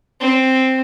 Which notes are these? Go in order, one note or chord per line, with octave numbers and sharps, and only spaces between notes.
C4